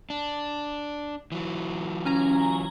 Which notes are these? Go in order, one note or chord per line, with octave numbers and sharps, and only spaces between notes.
D4
E3 F#3
C#4 G#5 A#5